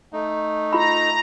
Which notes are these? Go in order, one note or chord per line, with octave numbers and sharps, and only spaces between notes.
A3 D#4
F4 A#5 B5